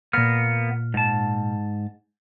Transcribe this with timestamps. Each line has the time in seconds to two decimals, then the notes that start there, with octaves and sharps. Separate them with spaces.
0.13 A#2 A#3 B3 F6
0.94 G#2 A5